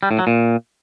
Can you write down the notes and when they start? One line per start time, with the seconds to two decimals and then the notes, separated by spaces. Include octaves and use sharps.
0.03 G3
0.11 A2
0.19 F#3
0.27 A#2